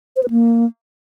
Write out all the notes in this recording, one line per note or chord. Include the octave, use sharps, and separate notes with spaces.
C5
B4
A#3